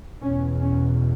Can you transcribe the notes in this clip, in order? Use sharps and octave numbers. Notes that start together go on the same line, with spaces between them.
E2 B2 C#4
C#4